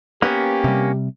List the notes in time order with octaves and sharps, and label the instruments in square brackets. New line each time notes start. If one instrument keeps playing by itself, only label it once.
[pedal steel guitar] A#3 C#4 [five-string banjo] B3 [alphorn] G4
[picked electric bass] C3 G3